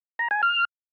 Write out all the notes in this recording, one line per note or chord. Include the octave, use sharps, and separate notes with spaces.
A#5
G#5
F6